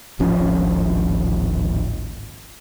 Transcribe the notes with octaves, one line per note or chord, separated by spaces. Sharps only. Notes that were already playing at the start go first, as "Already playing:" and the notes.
D1 G#1 F3 C#4